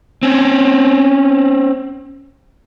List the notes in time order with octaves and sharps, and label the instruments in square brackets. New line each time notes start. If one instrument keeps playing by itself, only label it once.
[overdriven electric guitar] C4 C#4